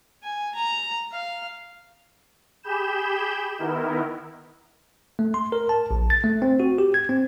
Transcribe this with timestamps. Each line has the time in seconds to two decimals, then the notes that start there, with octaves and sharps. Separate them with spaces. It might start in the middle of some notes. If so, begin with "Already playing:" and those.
0.23 G#5
0.55 A#5
1.12 F5
2.63 G4 G#4 B5 G6 E7
3.58 D#3 B3 E4 A#4
5.19 A3
5.34 C6
5.52 A#4
5.69 A5
5.91 A#1
6.10 A6
6.24 A3
6.42 C4
6.60 F#4
6.78 G4
6.94 G#6
7.09 C4